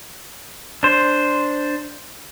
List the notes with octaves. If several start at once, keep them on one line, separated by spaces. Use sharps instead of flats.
D4 C5